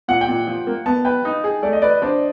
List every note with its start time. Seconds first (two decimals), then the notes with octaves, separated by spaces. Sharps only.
0.08 A#2 F#5
0.21 G5
0.28 A#2
0.47 F3
0.67 A#3
0.86 B3 A5
1.05 B4 G5
1.25 D#4
1.44 G#4
1.63 A3 D5
1.73 D#5
1.82 B4 D5
2.02 D4 C5